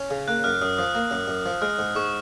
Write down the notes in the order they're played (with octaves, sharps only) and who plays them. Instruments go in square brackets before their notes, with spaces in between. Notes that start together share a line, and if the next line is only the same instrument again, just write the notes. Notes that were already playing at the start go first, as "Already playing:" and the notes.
Already playing: [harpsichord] C#4
C#3
[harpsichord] A#3 [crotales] F#6
[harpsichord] F#2 [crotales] F6
[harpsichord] F#2 [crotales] D#6
[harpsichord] F3 [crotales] D#6
[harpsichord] A#3
F#2
F#2
F3
[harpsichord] G#3 [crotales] F6
[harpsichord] G#2
[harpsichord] G#2 [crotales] C#6